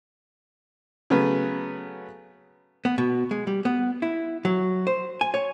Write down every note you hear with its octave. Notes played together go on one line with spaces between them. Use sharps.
C#3 F#3 A3 B3 B4
B3
B2
G#3
G3
B3
E4
F#3
C5
G#5
C#5